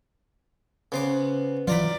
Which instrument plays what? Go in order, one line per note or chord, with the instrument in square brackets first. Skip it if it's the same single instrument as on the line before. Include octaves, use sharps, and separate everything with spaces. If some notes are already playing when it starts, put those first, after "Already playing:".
[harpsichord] C#3 C5 D6 [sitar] B3
[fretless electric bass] E3 F#3 [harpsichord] F4 A#5 B5 [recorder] D5